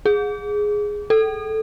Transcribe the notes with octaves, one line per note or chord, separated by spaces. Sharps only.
G#4
A4